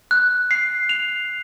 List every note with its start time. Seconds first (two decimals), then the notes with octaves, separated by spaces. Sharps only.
0.11 F#6
0.51 C7
0.89 F7